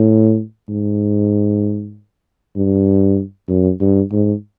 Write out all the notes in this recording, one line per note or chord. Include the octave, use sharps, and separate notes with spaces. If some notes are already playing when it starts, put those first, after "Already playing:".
Already playing: A2
G#2
G2
F#2
G2
G#2